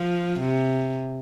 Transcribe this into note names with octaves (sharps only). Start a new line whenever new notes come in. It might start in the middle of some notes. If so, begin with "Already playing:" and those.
Already playing: F3
C3